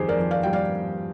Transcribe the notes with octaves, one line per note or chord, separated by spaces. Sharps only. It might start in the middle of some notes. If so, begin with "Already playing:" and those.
Already playing: F2 D#3 G3 G4 G#4 C5
A#4 D5
F2
D5 F5
G3 G5
D5 F5